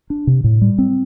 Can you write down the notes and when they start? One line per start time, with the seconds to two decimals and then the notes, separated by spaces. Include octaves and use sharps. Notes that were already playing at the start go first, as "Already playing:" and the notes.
0.10 D4
0.27 C3
0.44 A2
0.61 G3
0.78 C4